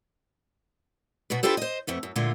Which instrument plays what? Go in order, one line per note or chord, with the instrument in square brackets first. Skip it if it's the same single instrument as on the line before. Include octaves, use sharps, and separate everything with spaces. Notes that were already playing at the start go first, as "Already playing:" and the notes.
[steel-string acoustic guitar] B2 F#3 B3 B4
D4 E4 F4 G4 A4 C5
C5 D#5
F2 A3 B3
F#2
A#2 D3 G#3 A3 F4